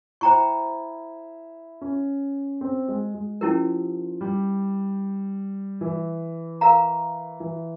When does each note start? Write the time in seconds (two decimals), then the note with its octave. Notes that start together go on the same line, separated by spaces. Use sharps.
0.21 E4 C5 G5 A#5 C#6
1.81 C#4
2.61 C4
2.88 G#3
3.14 G#3
3.41 F3 C#4 E4 G4 A#4
4.21 G3
5.81 E3
6.61 A#4 F5 A#5
7.40 E3